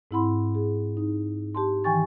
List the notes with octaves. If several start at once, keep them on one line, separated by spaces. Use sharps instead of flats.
G#2 C4 E4 F#5 B5 C6
G#4
D#4
G4 A5 C6
D#3 E3 G5 G#5 C#6 A6